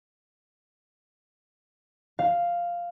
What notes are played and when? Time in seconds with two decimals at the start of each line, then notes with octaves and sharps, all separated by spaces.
2.19 F5